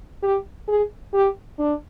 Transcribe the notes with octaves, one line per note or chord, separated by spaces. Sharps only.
G4
G#4
G4
D4